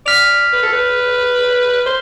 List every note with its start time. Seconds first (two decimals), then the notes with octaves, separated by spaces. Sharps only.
0.06 D5 F6 B6 F7
0.53 B4
0.63 A4
0.73 B4
1.86 C5